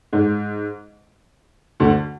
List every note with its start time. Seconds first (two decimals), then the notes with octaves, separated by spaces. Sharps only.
0.13 G#2
1.80 D2 D3